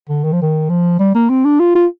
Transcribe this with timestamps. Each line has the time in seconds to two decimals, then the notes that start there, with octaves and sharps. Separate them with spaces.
0.09 D3
0.24 D#3
0.32 F3
0.42 D#3
0.69 F3
0.99 G3
1.15 A#3
1.29 C4
1.45 D4
1.60 F4
1.75 F4